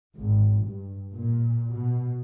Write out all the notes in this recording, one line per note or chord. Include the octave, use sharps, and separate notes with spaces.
G#1
G2
A#2
B2